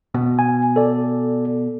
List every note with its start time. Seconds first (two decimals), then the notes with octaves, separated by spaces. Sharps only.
0.14 B2
0.39 G#5
0.76 A4 D5